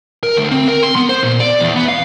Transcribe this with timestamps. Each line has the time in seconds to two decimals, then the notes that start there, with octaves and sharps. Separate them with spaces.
0.23 A#4
0.37 D2
0.51 C4
0.68 A#4
0.83 C6
0.96 B3
1.09 C5
1.23 A#2
1.40 D5
1.61 E2
1.75 B3
1.88 F5